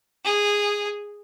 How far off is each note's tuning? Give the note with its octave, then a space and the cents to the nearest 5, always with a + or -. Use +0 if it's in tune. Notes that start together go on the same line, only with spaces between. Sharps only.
G#4 -10